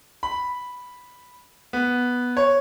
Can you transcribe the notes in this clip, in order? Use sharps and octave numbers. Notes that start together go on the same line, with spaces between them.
B5
B3
C#5